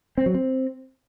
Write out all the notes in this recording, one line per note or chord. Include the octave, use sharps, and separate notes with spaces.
C4
F#3
C4